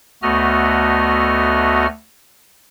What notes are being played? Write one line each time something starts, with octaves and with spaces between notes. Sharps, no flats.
D2 A3 B3 F#4 D#5 F6